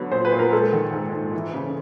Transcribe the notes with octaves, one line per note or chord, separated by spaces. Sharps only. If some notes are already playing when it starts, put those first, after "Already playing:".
Already playing: D3 F#3 B3
A#2 C5
B4
A#2
A#4
G#3 A4
D#3
G#2
G#2
E3
C#3